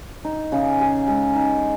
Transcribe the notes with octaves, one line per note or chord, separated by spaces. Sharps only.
D#4
C#3
G#4
G#3
D#4